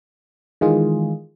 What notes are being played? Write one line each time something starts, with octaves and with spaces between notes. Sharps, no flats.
D#3 E3 G#3 F4 G#4